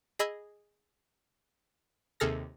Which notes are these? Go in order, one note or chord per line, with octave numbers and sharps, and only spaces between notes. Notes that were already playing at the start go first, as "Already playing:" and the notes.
G#4 D#5 B5 E6 G#6
D#2 C3 G#4 A4 F6 A#6